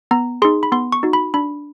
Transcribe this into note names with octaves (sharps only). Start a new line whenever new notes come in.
B3 A#5
D#4 G#4 C6
B5
B3 C6
C#6
D#4 F#4
B5
D4 B5